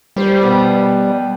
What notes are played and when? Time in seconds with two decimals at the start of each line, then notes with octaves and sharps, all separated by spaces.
0.16 G3 G4 C5
0.41 B2 B3